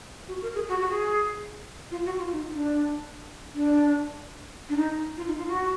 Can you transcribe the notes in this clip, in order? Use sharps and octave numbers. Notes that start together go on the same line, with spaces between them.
F#4
A#4
G#4
F#4
F#4
G#4
F4
F#4
F4
D#4
D4
D4
D4
D#4
F4
D#4
F4
F#4